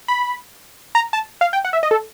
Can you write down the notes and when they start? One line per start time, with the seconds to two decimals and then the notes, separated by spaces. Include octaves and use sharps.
0.08 B5
0.95 A#5
1.13 A5
1.41 F5
1.53 G5
1.65 F#5
1.73 E5
1.83 D#5
1.91 A4